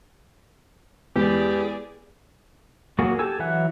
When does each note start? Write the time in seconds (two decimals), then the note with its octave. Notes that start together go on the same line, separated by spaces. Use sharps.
1.16 E2 G#3 B3 G4 G#4 B4 D5
2.99 F#3 A#3 F#4 G#4
3.19 G4 A4 G#5 E6
3.39 E3 F#3 E5 F#5 F#6